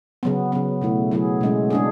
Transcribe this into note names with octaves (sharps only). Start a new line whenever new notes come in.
C#3 F#3 B3
C#3 F#3 B3
B2 A3 E4
F#3 B3 E4 G#4
B2 G#3 C#4
G#3 D4 G#4